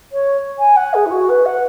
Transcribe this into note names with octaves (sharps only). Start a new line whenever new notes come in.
C#5
G#5
F#5
G#4
E4
F#4
B4
F#5